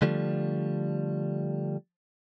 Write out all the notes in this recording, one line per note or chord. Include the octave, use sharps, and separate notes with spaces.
D3 F3 G3 A3